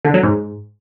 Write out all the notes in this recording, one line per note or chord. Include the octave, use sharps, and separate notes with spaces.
D3
F#3
G#2